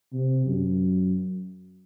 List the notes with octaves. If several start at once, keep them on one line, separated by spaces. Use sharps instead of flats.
C3
F#2